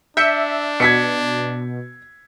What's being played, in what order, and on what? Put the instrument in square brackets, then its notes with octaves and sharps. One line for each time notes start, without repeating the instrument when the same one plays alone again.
[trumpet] D4 [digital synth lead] E5 [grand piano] G6 C#7
[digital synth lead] B2 [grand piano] G#6 B6 C#7